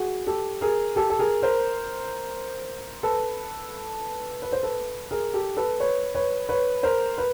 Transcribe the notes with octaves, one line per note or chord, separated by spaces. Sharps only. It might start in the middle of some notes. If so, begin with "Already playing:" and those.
Already playing: F#4 G#4
G4 A4
G#4 A#4
G4 A4
A4
G#4 A#4
A#4 C5
A4 B4
B4
C5
A4 B4
G#4 A#4
G4 A4
A4 B4
B4 C#5
B4 C#5
B4 C#5
A#4 C5
B4